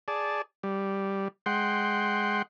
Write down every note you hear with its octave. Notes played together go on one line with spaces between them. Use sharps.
G#4 D5 A5
G3
G#3 F#5 G5 C6